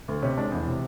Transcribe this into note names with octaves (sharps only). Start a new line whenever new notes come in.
D2
C3 C#4
G#3 D4
E2
C3